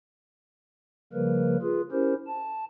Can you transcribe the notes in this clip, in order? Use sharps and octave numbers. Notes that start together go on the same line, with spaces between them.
C#3 F3 G3 A#3 A#4 B4
F4 G#4 B4
C#4 E4 G4 A#4 C5
A5